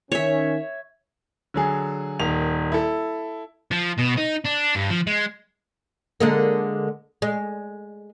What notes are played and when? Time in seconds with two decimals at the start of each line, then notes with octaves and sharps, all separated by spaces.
0.12 D#3 C#4 C#5 E5
1.54 D3 F#3 G#4
2.19 D#1 D#3 F7
2.72 E4 A4
3.71 F3
3.98 B2
4.18 D#4
4.45 D4
4.75 G2
4.90 F3
5.07 G#3
6.20 D3 G#3 A#3
7.22 G#3